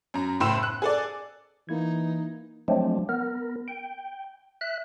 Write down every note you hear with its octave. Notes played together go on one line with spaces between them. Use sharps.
F#2 A#5
F#1 A2 G5 C6 E6 E7
F#6
G#4 A4 D5
E3 A#3 D#4 E4 G#6
F3 F#3 G#3 A3 C4 D4
B3 A#4
G5
E5 F#6